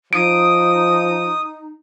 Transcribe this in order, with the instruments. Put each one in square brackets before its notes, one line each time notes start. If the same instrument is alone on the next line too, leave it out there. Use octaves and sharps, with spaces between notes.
[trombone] F3 [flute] D#4 [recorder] D#6 [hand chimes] D7